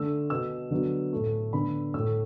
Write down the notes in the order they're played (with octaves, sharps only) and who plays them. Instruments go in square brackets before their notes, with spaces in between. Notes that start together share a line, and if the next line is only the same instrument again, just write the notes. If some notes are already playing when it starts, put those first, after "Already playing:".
Already playing: [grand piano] D3 A3 E6
B2 B3 E6
D3 F#3 B3
A2 A3
D3 B3 B5
A2 A3 E6